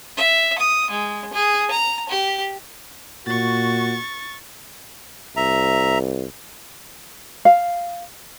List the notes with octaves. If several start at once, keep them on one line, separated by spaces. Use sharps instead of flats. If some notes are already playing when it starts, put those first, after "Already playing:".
E5
D#6
G#3
G#4
A#5
G4
A#2 F#4 C#6 A6
C2 E5 A#5
F5